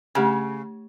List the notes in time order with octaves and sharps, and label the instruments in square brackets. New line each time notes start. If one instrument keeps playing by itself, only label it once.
[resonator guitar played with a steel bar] C#3 [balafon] A3 G4 G#5